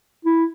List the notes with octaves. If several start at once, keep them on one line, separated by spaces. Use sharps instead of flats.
E4